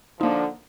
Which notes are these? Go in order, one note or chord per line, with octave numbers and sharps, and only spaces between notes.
D3 F3 A#3 D#4